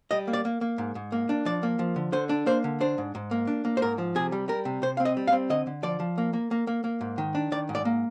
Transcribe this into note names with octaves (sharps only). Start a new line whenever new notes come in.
G3 D#5
A#3
D5
A#3
A#3
G#2
G#2
A#3
D4
F3 D5
A#3
F3
D3
D3 C5
D4
A#3 C5
D3
D4 C5
G#2
G#2
A#3
D4
A#3
C5
G#2 A#4
F3
C3 G#4
G3
G3 A#4
C3
C3 C5
C4 F5
D#5
G3
F5
C4
D3 D#5
D3
F3 D5
F3
A#3
A#3
A#3
A#3
A#3
G#2
D#3
D4
D#3 D5
G#2
D5
A#3